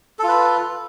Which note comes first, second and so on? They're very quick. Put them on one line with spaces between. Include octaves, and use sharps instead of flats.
A4 F4 B4